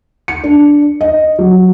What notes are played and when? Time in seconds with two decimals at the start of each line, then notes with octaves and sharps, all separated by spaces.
0.28 C#7
0.44 D4
1.01 D#5
1.39 F#3